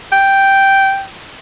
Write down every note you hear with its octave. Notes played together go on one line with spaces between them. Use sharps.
G5